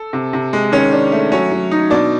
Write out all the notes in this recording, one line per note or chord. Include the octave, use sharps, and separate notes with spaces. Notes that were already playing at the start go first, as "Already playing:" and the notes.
Already playing: A4
C3
C3
G#3
D#3 C#4 C#5
D4
A3
F#3 C#4 C#5
F#3
D#4
B2 D4 D5